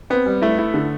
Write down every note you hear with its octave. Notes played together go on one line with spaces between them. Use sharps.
B3 C4
G3
A3 E4
E4
D3